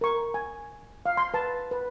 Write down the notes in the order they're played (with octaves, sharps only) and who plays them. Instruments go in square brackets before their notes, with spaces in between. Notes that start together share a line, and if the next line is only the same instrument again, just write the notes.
[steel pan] A#4 C#6
G#5
F5
C6
B4 A5
B4